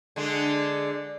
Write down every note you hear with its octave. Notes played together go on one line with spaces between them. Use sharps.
D3 G#3